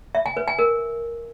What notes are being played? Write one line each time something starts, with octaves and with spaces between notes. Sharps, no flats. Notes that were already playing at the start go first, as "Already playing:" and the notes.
E5
G#5
B4
G#5
A#4